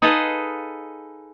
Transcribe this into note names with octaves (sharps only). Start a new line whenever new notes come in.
D#4 G#4 A4 B4 D#5 F5